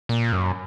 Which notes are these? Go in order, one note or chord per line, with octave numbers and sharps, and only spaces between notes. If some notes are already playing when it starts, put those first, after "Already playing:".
A#2
F#2